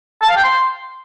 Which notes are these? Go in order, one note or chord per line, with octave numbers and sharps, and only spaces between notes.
A5
F5
G5
C6